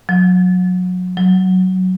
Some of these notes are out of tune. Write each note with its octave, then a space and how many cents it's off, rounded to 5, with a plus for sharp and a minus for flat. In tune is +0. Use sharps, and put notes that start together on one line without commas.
F#3 -25
F#3 +5